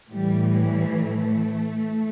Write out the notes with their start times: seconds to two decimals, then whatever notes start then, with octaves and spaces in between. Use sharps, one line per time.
0.12 A2 E3 G3
0.59 G3
1.06 A3